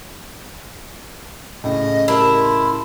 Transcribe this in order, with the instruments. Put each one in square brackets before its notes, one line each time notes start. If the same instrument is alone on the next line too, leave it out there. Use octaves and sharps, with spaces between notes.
[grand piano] A2 C#3 [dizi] D#5
[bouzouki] E4 [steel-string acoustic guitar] G4 A#4 A5
[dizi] C6